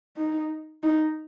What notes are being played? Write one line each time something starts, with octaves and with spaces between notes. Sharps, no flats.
D#4
D#4